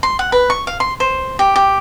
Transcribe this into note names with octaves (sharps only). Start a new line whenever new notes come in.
C6
F#5
B4
C#6
F5
C6
C5
G4
G4